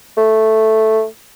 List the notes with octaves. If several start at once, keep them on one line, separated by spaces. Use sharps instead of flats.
A3